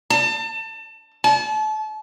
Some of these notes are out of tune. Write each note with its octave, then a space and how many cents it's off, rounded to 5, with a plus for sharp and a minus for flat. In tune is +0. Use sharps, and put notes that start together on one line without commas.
A5 +30
A5 -35